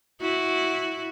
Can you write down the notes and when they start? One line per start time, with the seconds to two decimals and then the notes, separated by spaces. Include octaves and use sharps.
0.21 E4 F#4